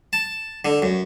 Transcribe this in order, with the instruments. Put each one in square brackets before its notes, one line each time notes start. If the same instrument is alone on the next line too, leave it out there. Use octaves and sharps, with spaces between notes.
[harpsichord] A5
D3
F#2